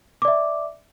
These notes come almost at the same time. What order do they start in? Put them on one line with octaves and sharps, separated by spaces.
D6 D5 E5